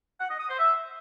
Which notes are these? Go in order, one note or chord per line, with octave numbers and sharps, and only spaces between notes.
F#5
D#5
D#6
C5
E5